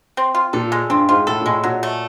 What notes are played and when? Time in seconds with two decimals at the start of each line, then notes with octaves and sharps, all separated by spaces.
0.17 C4
0.35 F4
0.53 A#2 A4
0.72 G#3
0.90 G2 C4
1.09 G#2 F4
1.27 A2 A4
1.41 A#2
1.46 A2 G#3
1.64 A#2 F#3
1.83 A3